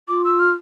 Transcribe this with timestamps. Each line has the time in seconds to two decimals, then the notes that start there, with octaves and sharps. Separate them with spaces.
0.08 F4 D6
0.24 E6
0.39 F6